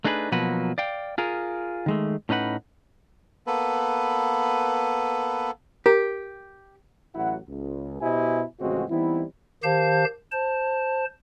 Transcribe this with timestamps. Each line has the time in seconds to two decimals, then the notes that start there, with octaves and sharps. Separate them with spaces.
0.04 A3 D4 D#4 G#4 A4 B4
0.32 B2 F3 F#3 A#3 F#4 B4
0.78 D5 F5 G5
1.18 F4 G#4 A#4
1.86 D#3 G#3 A3
2.29 A2 C#4 D#4 B4 F#5
3.47 A#3 B3 A4 B4
5.86 G4 A#4
7.15 A1 F#3 E4 F#4 F#5
7.48 C#2
8.01 B2 E4 G4 C5 D#5 G#5
8.60 A1 F2 C#3 G#3 C4 F#4
8.90 E3 G3 B3 C4 D#4 E4
9.63 D#3 G4 C5 F5 A5 G6
10.32 C5 A5